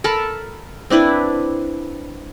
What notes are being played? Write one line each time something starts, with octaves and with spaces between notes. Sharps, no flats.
A4 A#4 A5 B5
C4 D4 E4 B4